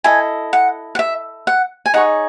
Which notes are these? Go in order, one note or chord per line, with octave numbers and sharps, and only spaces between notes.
E4 A4 D#5 G#5
F#5
F#5
E5
F#5
G#5
D#4 G#4 C#5 F#5